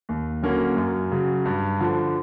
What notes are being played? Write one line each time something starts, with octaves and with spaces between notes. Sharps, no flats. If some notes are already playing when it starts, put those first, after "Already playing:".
D#2
D3 F#3 A#3 C#4
F#2
C#3 F#3
G2
D3 F3